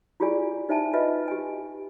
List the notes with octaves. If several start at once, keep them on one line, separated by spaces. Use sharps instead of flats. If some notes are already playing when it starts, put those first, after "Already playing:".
E4 F4 G4 G#4 D5 G#5
D#4 C5 E5 G#5 A5
F4 B4 D#5 E5
G4 G#5